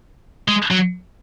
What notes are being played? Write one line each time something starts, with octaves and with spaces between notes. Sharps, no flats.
G#3
F#3